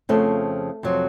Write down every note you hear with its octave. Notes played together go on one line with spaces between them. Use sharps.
F2 C#3 F3 A3
F2 C3 F#3